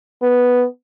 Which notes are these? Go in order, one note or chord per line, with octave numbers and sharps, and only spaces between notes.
B3